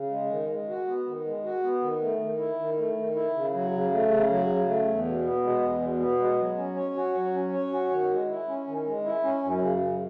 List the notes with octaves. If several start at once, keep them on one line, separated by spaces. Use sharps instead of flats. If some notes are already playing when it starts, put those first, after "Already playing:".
Already playing: C#3
G#3
D#3
G#3
F#4
B3
D#3
G#3
F#4
B3
D#3
A3
D#3
E4
D#3
A3
D#3
E4
C#3
F#3
C#3
A3
C#3
F#3
C#3
A3
E2
B2
B3
G#3
E2
B2
B3
G#3
F#3
C#4
C#5
F#4
F#3
C#4
C#5
F#4
D#3
G#3
E4
C#4
D#3
G#3
E4
C#4
F#2
C#3
F#2